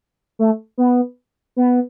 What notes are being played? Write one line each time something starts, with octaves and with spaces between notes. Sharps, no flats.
A3
B3
B3